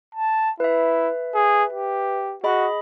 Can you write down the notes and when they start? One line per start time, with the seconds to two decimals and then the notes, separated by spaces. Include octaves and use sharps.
0.15 A5
0.60 E4 B4 E5
1.35 G#4
1.73 G4
2.44 F#4 G#4 D#5 B5